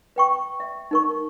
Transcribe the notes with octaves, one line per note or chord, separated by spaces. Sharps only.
B4 G5 C#6
E5
D#4 A#4 C#6